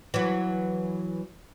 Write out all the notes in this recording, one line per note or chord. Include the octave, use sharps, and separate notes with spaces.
E3 F#3